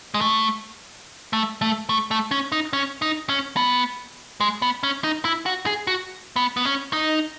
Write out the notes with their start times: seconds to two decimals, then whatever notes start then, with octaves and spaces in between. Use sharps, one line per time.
0.14 G#3
0.21 A3
1.33 A3
1.61 A3
1.89 A3
2.11 A3
2.31 C#4
2.52 D#4
2.73 C#4
3.02 D#4
3.29 C#4
3.57 B3
4.41 G#3
4.62 B3
4.83 C#4
5.04 D#4
5.25 E4
5.46 F#4
5.66 G#4
5.87 F#4
6.36 B3
6.57 B3
6.65 C#4
6.93 D#4